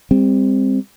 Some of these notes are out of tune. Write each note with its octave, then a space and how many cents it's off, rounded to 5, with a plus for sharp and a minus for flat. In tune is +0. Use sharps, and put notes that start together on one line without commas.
G3 +35 C4 +0